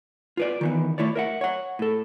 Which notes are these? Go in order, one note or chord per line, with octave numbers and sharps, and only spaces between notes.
F4 B4 D5
D#3 E3 B3
A3 E4 C#5 D5
A#4 E5 F#5
C#5 F#5
A2 A4